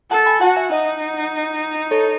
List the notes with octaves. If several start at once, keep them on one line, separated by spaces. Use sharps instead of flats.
A4 F#5 A5
G#5 B5
F#4 F#5 A5
E5 G#5
D#4 D#5 F#5
A4 C#5